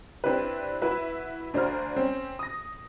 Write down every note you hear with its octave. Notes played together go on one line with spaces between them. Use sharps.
C4 D4 E4 G4 B4
E4 F#4 B4 E5
D2 D4 F#4 C5 A#5 F6
C4 C#4
D#6 A#6